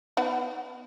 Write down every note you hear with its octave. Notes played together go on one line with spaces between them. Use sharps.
B3 D#4 F#5